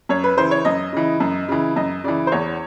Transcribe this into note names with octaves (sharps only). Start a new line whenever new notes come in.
F#2 C#5
B4
C#3 E3 C5
C#5
F#2 D#5
C#3 E3
F#2
C#3 E3
F#2 D#5
C#3 E3 D5
C5
E2 C#5